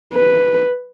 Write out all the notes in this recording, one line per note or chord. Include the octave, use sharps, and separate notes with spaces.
B4